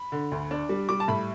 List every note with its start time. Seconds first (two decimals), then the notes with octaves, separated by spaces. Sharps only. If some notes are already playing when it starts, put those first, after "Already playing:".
Already playing: B5
0.12 D3
0.32 D2
0.51 D4
0.69 G3
0.89 G3 D6
1.00 A5
1.08 A2 B5